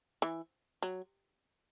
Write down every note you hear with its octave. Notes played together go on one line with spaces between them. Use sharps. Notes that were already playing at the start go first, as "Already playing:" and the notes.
E3
F#3